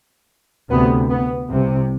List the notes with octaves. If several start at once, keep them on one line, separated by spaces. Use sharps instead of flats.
D2 C3 B3
B3
C2 C3